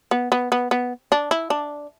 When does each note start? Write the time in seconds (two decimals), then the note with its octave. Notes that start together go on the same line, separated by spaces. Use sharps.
0.11 B3
0.32 B3
0.52 B3
0.71 B3
1.12 D4
1.31 E4
1.50 D4